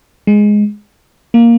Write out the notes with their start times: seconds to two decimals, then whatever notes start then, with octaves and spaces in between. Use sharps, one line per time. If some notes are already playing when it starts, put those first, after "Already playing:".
0.27 G#3
1.34 A#3